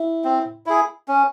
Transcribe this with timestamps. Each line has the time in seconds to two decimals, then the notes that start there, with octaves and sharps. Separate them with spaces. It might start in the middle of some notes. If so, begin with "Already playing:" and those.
Already playing: E4
0.24 C4
0.66 E4 G#4
1.08 C#4